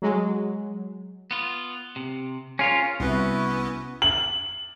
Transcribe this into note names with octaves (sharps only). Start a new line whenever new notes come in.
F#3 G#3
B3 F4
C3
C#4 F4 G#4 A#4 C#5
C2 B3 C#4 E4 F#4 B4
F#7